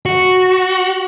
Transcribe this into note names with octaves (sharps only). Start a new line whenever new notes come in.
F#4